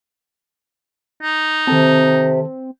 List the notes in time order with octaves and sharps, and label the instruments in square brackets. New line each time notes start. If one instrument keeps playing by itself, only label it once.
[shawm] D#4
[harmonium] C3 [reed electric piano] D#3 A4 A5 [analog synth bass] C4